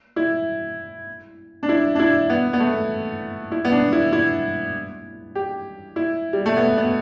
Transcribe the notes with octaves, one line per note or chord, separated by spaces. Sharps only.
E4
D4
E4
D4
E4
B3
B3
A3
E4
B3
D4
E4
E4
G4
E4
G3
A3
B3
B3